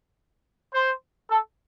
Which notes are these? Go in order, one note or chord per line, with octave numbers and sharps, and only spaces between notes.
C5
A4